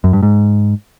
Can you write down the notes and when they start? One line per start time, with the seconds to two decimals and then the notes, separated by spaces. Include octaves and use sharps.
0.04 F#2
0.13 G2
0.23 G#2